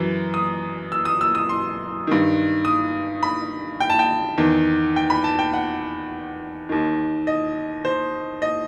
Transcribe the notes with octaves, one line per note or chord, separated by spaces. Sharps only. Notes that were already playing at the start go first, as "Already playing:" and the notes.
Already playing: F#2 E3
D#6
E6
D#6
E6
D#6
C6
G2 D#3
D#6
B5
G5
A5
G5
E2 D#3
G5
B5
A5
G5
F#5
D#2 D#3
D#5
C5
D#5